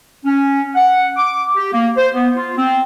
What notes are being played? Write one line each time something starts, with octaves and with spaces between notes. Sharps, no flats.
C#4
F#5
D6
G4
A#3
C5
B3
F4
C4